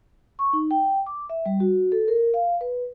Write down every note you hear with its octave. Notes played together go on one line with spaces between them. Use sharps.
C#6
D#4
G5
D6
E5
G3
F#4
A4
A#4
F5
B4